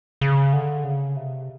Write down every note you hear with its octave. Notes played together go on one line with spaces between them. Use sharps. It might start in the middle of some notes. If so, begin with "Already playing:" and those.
C#3
D3
C#3
C3